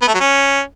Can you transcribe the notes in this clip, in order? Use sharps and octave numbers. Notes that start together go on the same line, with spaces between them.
B3
A3
F#3
C#4